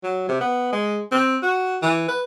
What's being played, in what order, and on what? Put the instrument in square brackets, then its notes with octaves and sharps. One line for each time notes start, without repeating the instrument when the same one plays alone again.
[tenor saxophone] F#3
C3
B3
G#3
C4
F#4
E3
B4